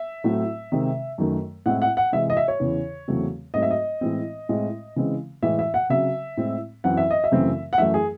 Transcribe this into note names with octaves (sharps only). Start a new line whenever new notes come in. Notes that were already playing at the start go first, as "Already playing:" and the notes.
Already playing: E5
A2 F#3 A3 C4
C3 D#3 G#3 C4
F#2 D#3 A3
A2 G#3 C4 F#5
F#5
F#5
C3 E3 G#3 E5
D#5
E5
C#5
E2 C#3 E3
E2 C#3 F#3 A3 C4
G#2 F#3 A3 C4 D#5
E5
D#5
A2 E3 G#3 C4
A2 G#3 C4
C#3 E3 G#3 C4
A2 E3 G#3 E5
E5
F#5
C#3 F#3 C4 E5
A2 G#3 C4
F#2 E3 C4 F#5
E5
D#5
E5
F#2 C#3 E3 A3 C4
F#5
F#2 E3 A3 E5
G#4